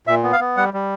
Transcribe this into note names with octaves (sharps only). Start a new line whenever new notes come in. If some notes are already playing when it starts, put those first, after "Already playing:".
A#2 E5
B3
F5
B3
G3 F#5
G3